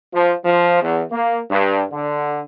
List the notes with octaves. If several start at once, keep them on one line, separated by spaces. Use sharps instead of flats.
F3
F3
E2
A#3
G2
D3